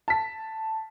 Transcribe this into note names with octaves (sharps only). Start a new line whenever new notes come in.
A5 B6